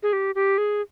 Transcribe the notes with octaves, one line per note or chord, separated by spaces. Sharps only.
G#4
G4
G4
G#4